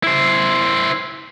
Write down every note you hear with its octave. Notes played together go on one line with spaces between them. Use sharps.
E4 C5